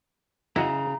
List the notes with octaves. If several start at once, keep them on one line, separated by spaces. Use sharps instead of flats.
C#3 E4 F#4 D#5 A#5